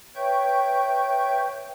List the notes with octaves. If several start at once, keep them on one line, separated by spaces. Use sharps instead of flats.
B4 C#5 E5 G5 C#6 G6